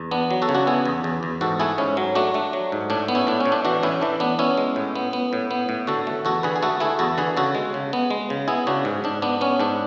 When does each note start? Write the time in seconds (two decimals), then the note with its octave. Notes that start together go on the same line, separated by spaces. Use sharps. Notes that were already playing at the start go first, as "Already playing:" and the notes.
Already playing: E2
0.11 B3 D4
0.31 F#3
0.42 F#4 A4
0.49 C#3
0.55 D4 F#4
0.67 B3 E4 G#4
0.85 E2
1.04 E2
1.23 E2
1.41 G#2 F#4 A4
1.60 A3 E4 G#4
1.78 G#2 C#4
1.97 F#3
2.15 A3 D4 F#4
2.34 A3 D4
2.53 F#3
2.72 G#2
2.90 A2 D4
3.08 B3
3.15 C#4 E4
3.27 A2 D4
3.40 C#4
3.46 A2
3.52 D4
3.65 E3 D4 F#4
3.83 A2 C#4 E4
4.01 E3 D4
4.20 B3 D4
4.39 B3 C#4 E4
4.57 G#3
4.76 A2
4.96 B3
5.13 B3
5.33 A2
5.51 B3
5.69 A2
5.87 D3 F#4 A4
6.07 A3
6.25 E2 F#4 A4
6.43 D3 G#4 B4
6.56 G#4
6.62 A3 F#4 A4
6.80 A3 E4 G#4
6.99 E2 F#4 A4
7.18 D3 G#4 B4
7.37 C#3 F#4 A4
7.55 G#3
7.74 C#3
7.93 B3
8.10 G#3
8.30 C#3
8.48 B3 E4 G#4
8.67 C#3 D4 F#4
8.85 G#2
9.04 G#2 D4
9.22 B3 D4
9.41 B3 C#4
9.60 G#2 D4